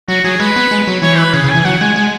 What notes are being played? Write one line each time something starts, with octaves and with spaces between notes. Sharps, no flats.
F#3 F#4
F#3 G#4
G#3 B4
B3
G#3
F#3
E3 C#5
B4
C#3 G#4
C#3
G#5
E3
G#5
F#3 F#5
G#3 G#5
G#3 G#5